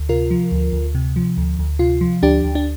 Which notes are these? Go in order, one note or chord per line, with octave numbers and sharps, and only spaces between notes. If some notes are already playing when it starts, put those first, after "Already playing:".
Already playing: D2
C3 F4 A#4
F3
D2
D2
C3
F3
D2
D2
C3 F4
F3
D2 D4 G4
D2
D4